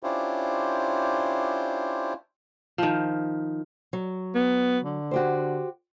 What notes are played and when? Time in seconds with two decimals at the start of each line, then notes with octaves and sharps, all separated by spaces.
0.03 C#4 D4 E4 F4 G4 C5
2.78 D#3 F3
3.93 F#3
4.35 B3
4.84 D3
5.11 F#4 G4 C5